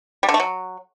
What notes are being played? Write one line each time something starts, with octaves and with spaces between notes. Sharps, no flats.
G3
D3
A3
F#3